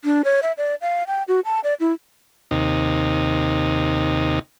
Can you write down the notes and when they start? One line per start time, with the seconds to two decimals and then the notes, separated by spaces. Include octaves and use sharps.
0.05 D4
0.25 C#5
0.43 E5
0.58 D5
0.81 F5
1.07 G5
1.28 F#4
1.45 A5
1.64 D5
1.80 E4
2.51 D#2 C3 D#4